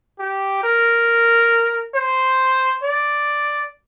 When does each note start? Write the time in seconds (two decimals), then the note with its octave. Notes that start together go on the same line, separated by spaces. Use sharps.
0.19 G4
0.64 A#4
1.95 C5
2.83 D5